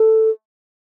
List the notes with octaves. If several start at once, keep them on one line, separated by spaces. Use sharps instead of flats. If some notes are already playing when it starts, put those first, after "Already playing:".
Already playing: A4